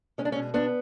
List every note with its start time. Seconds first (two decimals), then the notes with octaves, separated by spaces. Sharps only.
0.18 G#3 C#4
0.25 D4
0.32 C#4
0.36 B2
0.54 B3 D4